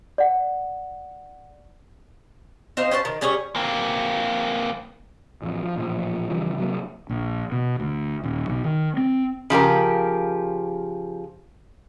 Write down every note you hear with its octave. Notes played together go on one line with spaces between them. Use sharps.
D5 F#5
C4 D#4 C5 F5
C#4 C5 F5 A5
D#3
G3 C#4 G#4 C#5
A#3 C4
A1 F2
F3
A1 A#2 F3
C#3 E3 F3 G3
C3 F#3 A#3
A#1
B2
D2
D#1
B1
D#3
C4
C#3 F3 G4 A#4